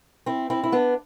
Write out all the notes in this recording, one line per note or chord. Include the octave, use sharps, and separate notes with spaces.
C4 E4
C4 E4
E4
B3 D4